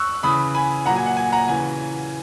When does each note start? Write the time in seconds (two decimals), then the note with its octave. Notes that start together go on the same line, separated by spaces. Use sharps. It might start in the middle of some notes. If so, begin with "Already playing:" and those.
Already playing: C#6 E6 F#6
0.23 C#3 E3 B5 D#6
0.54 G#5 B5
0.86 A#2 F#3 F#5 A#5
0.96 G#5
1.06 F#5
1.17 G#5
1.32 F#5 A#5
1.48 C#3 E3 G#5